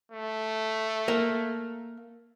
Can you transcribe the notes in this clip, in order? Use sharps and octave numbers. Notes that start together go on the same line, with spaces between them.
A3
A#3